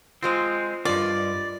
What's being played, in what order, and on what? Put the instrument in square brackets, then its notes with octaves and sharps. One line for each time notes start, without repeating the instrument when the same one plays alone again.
[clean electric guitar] G#3 C4 [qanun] F4 C5 A#5
[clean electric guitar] E2 G2 [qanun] F4 A#4 D#5 [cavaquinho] D5